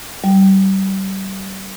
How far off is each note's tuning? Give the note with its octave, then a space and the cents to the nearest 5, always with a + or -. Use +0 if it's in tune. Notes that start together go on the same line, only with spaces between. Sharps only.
G3 -30